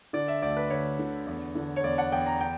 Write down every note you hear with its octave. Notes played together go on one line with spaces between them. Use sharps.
D3 D5
E5
D2 D5
B4
D2 C#5
D3
E2
D3
C#5
E2 D5
F#5
E2 G5
A#5
G5